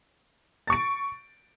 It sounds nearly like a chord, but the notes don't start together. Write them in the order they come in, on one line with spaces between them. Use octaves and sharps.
A6 C#6 D7